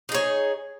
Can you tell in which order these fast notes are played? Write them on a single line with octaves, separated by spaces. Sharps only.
D#4 G#4 C#5